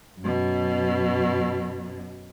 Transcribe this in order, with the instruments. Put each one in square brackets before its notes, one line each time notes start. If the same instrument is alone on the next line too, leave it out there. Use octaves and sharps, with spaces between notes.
[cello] F#2 B2